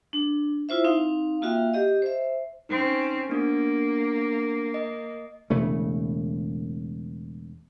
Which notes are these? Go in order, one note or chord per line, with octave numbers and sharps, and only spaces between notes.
D4
E4 F4 C5 E5
C4 D#4 F5
A#3 F4 F#4 E5 F5 G5
G4 D#5
C5 E5
C4 C#4 D#4
A#3 B3 D4 F#4
D#5
E1 C#3 A3